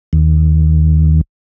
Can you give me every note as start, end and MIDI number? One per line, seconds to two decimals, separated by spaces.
0.13 1.21 39